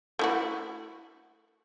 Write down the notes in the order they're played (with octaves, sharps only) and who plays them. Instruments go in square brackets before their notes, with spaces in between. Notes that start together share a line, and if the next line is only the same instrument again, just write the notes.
[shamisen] A3 E4 F#4